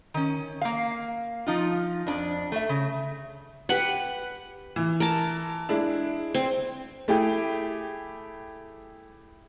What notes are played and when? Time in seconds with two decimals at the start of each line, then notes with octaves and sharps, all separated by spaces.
0.14 D#3 C#4
0.61 A#3 F5
1.47 F3 D#4 F4
2.07 F2 D4
2.52 A3 E5
2.69 C#3
3.69 G4 B4 F#5
4.76 E3
5.00 A#4 A5
5.69 G#3 D4 E4
6.34 C4
7.08 A3 E4 G4 G#4 G5